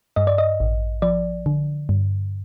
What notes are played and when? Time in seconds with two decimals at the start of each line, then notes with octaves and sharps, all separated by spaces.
0.16 G2 D#5
0.27 D5
0.38 D#5
0.60 A1
1.02 F3 D5
1.46 D3
1.89 G2